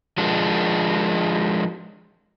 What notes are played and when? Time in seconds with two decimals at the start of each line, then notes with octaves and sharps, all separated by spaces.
0.18 F3 G#3 D4